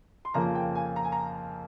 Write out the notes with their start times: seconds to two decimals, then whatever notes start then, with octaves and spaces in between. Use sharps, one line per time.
0.25 C6
0.34 F2 C#3 F3 A#3 A#5
0.55 G5
0.75 G#5
0.96 A#5
1.04 G#5
1.12 A#5